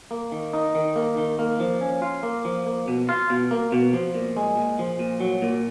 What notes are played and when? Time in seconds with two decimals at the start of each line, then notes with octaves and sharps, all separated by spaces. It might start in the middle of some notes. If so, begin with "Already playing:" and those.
0.11 A#3
0.32 D#3
0.53 D#4
0.75 D#3
0.96 A#3
1.18 D#3
1.39 A#3
1.60 F3
1.81 C#4
2.02 F4
2.23 A#3
2.45 F3
2.67 A#3
2.88 B2
3.09 F4
3.30 B2
3.51 A#3
3.72 B2
3.93 F3
4.14 A#2
4.37 G#3
4.57 A#2
4.79 F3
4.99 A#2
5.20 F#3
5.42 A#2